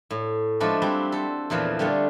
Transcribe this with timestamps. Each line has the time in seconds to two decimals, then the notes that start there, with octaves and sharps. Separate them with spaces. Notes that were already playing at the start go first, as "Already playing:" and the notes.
0.10 A2
0.60 F3 G#3 A3 D4 B4 D5
0.82 G3 C4 E4 F#4 E5
1.12 A4 C5
1.50 E2 A#2 E3 F3 E4
1.79 D3 G3 A3 F4 G#4